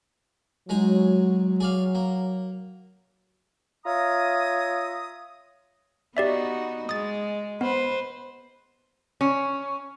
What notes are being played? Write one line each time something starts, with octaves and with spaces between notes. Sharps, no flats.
F#3 G#3 D#4 G#4
G#4 D5 F5
A#3
F4 C#5 E5 A#5 D#6
B3 D#4 F#4 G4 D5 E5
G#3 D#6 A6
B3 B4 C5
C#4